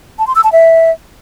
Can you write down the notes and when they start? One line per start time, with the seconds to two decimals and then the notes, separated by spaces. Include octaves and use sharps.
0.19 A5
0.27 C6
0.35 E6
0.44 A5
0.52 E5